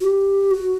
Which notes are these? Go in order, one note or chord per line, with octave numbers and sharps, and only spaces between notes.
F#4
G4
F#4